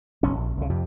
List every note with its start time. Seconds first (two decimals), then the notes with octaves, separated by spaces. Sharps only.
0.23 F#1 B1 C#4
0.37 A#1
0.58 C2 C#3
0.70 F2 C3